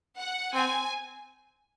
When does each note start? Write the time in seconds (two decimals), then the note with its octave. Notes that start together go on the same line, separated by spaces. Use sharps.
0.19 F#5
0.54 C4 G#5